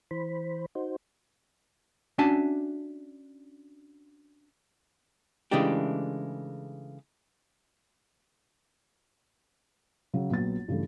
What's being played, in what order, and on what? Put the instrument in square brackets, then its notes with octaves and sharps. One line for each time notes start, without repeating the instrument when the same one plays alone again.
[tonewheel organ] E3 C5 B5
D#4 F#4 C5
[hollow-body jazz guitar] C#4 D4 F#4 E5 G#5 A5
C#3 E3 G#3 A3 D4 G4
[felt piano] C#3 F#3
A#1 F#3 B3 A6
G2 C#3 E3 A3